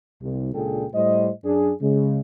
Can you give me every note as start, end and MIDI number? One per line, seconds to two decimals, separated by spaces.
0.22 0.51 36
0.54 0.86 37
0.54 0.86 46
0.54 0.86 62
0.54 0.86 68
0.54 0.86 69
0.54 0.86 79
0.94 1.31 45
0.94 1.31 55
0.94 1.31 72
0.94 1.31 75
1.44 1.72 42
1.44 1.72 62
1.44 1.72 68
1.81 2.20 49
1.81 2.20 56